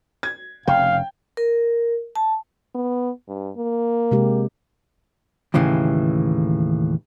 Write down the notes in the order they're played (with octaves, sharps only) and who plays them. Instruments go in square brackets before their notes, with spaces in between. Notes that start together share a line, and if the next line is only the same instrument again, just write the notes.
[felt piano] G#6
[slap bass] F1 C#3 [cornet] F5 [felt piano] G5
[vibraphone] A#4
A5
[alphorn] B3
G2
A#3
[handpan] C3 G#3 G4
[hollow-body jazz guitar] D#2 A2 C#3 E3